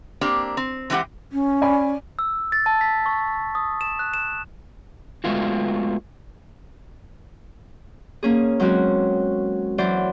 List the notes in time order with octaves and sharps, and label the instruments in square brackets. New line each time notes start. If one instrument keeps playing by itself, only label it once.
[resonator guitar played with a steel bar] A#3 C4 D4 G4
C4
E3 G#3 C4 C#4 G4 F#5
[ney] C#4
[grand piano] D5 G#5 B5
[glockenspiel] E6
A6
A5
B6
C#6
D#6
E7
F#6
E7
[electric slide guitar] G#3 A3 B3 F4 F#4
[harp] A#3 C#4 G#4
F#3 G#3 C4 C#4 F#4
E3 F#3 F#4 C5 D5